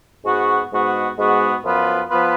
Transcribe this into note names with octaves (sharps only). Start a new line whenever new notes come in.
G#2 G#3 B3 F#4
G#2 G#3 B3 F#4
G#2 G#3 B3 F#4
F#2 F3 B3 F4 B4
F3 B3 F4 B4